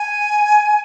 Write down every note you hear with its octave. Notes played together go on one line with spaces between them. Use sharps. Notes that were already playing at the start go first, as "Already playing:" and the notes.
Already playing: G#5